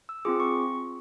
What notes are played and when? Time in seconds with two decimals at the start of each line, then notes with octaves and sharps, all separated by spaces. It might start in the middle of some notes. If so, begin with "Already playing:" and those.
0.09 E6
0.25 C4 F4 G#4 D6
0.40 C#6